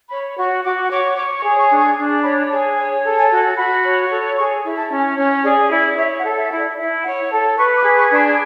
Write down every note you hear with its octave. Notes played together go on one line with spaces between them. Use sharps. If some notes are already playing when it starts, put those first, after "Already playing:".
C#5 B5
F#4 C#6
F#4 D6
C#5 D6
C#5 D6
C#6
G#4
C#6
D4
C#6
D4
C#5 B5
G#4 A5
C#5 G#5
A4
G#5
F#4
A5
F#4 B5
C#5
A4
G#4 C#6
E4
A5
C#4
G#5
C#4 C#5
G#4 D5
E4 D5
C#5 E5
F#5
A4
E5
E4
D5
E4 E5
C#5 F#5
A4 A5
B4 C#6
D6
G#4
C#6
D4 C#6
B5